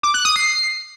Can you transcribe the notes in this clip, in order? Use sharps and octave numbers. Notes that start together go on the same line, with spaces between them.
D6
F#6
D#6
C7